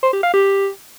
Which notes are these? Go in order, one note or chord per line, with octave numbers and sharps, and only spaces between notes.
C5
G4
F5
G4